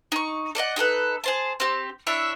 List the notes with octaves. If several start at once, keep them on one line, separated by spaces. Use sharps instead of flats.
D#4 C#6
A4 D5 D#5 F#5
D#4 G4 A4 B4
G#4 C5 A5
C4 G4
D4 E4 C#5 E5